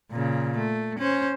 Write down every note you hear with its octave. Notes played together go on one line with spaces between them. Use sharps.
A#2 C#3
A3
C#4 C5